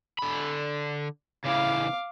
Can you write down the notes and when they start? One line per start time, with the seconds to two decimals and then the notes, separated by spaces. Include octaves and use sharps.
0.18 D3 B5
1.45 C#3 E3 F5 D6